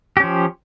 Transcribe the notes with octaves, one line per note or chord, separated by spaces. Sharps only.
F3 C#4 G4